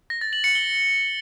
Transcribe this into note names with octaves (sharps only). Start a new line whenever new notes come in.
A#6
A6
F#7
C#7
G7